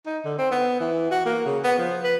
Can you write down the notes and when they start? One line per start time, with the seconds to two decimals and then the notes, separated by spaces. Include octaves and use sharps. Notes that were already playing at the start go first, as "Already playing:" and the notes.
0.06 D#4
0.25 D3
0.38 C4
0.51 B3
0.80 E3
1.11 F#4
1.26 A#3
1.46 C#3
1.64 B3
1.78 F3
2.04 B4